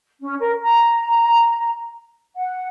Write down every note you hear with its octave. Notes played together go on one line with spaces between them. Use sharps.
C#4
A#4
A#5
F#5